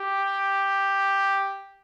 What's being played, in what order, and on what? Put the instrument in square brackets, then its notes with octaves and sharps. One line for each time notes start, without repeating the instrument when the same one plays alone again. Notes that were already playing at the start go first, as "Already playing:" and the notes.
Already playing: [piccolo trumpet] G4